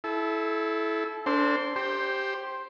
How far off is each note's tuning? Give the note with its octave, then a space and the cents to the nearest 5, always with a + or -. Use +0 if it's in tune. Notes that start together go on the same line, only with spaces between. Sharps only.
E4 +0 A4 -30
D4 -30 A4 +40 C5 +0
G4 +0 C5 +10